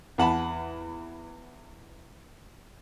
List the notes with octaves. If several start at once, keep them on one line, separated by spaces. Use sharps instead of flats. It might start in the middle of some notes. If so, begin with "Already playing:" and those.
E2 F#5 A5 B5